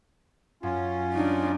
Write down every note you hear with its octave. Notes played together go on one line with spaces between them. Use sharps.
F#2 C#4 F4
D4 D#4